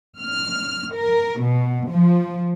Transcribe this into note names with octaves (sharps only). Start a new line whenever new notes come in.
F6
A#4
B2
F3